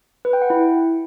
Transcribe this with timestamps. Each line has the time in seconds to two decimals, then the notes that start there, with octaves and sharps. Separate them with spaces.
0.25 B4
0.33 G5
0.42 F#5
0.50 E4